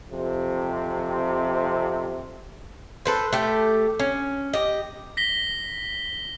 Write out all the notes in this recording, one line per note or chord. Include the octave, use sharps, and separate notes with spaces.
F2 C3
A4 B4 C5
A3 G4
C#4
G4 D#5
A#6 B6 G7